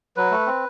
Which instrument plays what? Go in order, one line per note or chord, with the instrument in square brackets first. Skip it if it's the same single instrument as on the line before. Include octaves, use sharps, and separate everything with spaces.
[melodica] F#3 B4
A3
C4